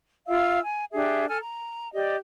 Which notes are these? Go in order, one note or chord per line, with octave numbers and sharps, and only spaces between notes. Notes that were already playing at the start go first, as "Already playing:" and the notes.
F4 E5 F5 E6
G#5
D4 G4 G#4 E5
A4 G#5 F6
A#5
G4 D5 D#5